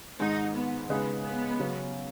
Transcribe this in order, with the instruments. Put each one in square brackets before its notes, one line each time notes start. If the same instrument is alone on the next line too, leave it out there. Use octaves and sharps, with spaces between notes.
[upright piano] G#2 D#3 G#3 [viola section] D#4
[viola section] B3
[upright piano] C#3 G#3 D#4 G#4 B4 [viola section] B3
[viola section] B3
[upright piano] C#3 F#3 C#4